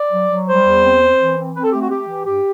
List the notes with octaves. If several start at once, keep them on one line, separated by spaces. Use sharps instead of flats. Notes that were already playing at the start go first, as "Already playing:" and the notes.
Already playing: D5
F#3
F#3
G3 C5
E2
C4
C4
E3
C4
C4 B4
A4
A3 G4
F#4
A3 G4
E3
G2 G4